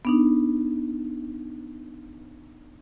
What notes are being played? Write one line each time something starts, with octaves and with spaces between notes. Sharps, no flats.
B3 D4 D#4